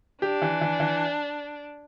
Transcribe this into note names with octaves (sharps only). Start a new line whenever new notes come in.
D4 G4
E3
E3
E3